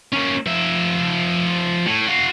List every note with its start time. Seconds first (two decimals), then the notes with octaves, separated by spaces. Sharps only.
0.13 A#3 C#4
0.47 F3 E5
1.87 A2
2.07 F#4 F5